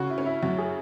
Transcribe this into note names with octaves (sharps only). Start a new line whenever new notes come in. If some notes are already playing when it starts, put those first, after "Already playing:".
Already playing: C#3 F#4
E4
C#4
E4
F#2 F#4
G#4